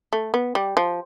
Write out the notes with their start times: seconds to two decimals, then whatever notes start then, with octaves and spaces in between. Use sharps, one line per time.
0.13 A3
0.34 B3
0.55 G3
0.77 F3